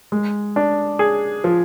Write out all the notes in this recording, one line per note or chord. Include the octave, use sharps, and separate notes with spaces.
G#3
D4
G#4
F3